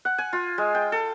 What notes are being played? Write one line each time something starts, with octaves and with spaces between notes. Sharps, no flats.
F#5
G#5
F4
G#3
G5
A4